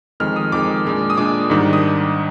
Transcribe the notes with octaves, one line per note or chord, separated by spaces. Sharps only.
F2 D#3 G#3 F6
D#6
F2 D#3 G#3 D6
A#2 G#3 D4
D#6
A#2 G#3 D4 D6
G#2 D#3 G3 D4
D#6